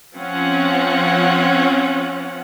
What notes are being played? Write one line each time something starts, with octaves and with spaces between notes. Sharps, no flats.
F3 C4 C#4 F#5